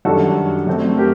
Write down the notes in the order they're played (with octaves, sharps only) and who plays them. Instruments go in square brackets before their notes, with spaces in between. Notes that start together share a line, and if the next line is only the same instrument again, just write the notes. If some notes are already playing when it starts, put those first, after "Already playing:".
[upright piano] F#2 D#3 G3 D4 [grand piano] F#4 A4
[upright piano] F#2 F#3 A3 C4
[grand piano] G4 A#4